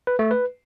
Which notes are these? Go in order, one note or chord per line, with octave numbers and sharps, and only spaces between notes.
B4
A3
B4